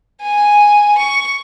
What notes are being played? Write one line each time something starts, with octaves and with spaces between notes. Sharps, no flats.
G#5
C#6